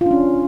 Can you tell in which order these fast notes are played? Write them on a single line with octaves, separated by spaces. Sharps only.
F4 D4 C#4